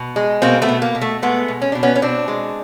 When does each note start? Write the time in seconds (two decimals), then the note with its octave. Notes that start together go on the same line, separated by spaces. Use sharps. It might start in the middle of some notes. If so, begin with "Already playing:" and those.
Already playing: B2
0.16 G#3
0.42 B2 A#3 C4
0.62 A3 B3
0.69 B2
0.82 A#3
0.95 B2
1.01 A3
1.22 G#3 A3 B3
1.48 B2
1.62 C#4
1.72 B2 D4
1.83 B3 C#4
1.95 C#4
2.02 B2 C4 D4
2.28 G#3